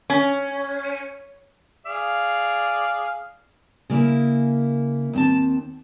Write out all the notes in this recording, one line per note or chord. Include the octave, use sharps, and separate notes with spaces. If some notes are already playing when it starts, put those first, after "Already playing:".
C#4
G#4 D5 F5
C#3 A#3 E4
D#2 C4 A5